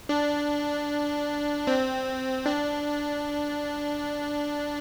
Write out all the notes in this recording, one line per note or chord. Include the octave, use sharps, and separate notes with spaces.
D4
C4
D4